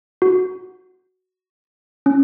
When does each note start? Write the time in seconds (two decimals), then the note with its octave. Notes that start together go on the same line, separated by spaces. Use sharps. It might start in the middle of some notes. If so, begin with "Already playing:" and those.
0.22 F#4
2.06 C#4